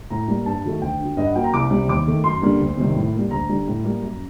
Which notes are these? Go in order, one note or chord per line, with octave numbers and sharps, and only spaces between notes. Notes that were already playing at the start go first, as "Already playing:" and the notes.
A2 A#5
G3 A#3
G2 A5
D#3 F#3 A3
D2 G5
D3 F#3
G2 D#5
F#5
F#3 A#3 G5
A#5
C2 D6
C3 G3
D#2 D6
D#3 A3
F#2 C6
D3 G3 A#3
D2
C3 D#3 G3
A2
G3 A#3
D2 A#5
D3 G3
A2
G3 A#3
F#2